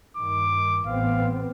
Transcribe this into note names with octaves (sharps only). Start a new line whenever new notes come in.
G2 D#3 D6
A1 B3 C4 F5